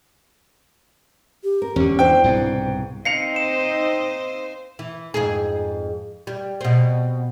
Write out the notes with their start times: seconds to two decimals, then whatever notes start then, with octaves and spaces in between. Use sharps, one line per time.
1.44 G4
1.62 A#4
1.76 E2 D3 C#4
1.99 D4 E4 C5 G5
2.24 C2 G#2 B2
3.05 C4 D#4 D#5 F5 C7 C#7 F7
3.36 C5 E7
4.79 E3
5.14 F2 G#2 G#4
6.27 G3
6.61 B2 C4